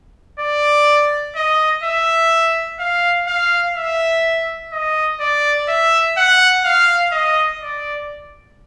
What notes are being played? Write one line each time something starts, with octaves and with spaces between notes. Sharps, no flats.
D5
D#5
E5
F5
F5
E5
D#5
D5
E5
F#5
F5
D#5
D5